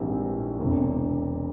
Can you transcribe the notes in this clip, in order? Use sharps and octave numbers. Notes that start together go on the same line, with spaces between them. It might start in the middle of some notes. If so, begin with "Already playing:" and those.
Already playing: A#1 G#2 E3 G3 C4
E1 E2 C3